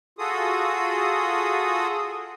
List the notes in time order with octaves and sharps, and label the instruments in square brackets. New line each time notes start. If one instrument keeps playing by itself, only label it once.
[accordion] F4 F#4 G#4 A4 D#6